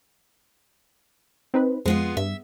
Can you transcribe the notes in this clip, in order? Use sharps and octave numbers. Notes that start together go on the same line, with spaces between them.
C4 D#4 B4
F2 G#3 B3 F4
G2 E5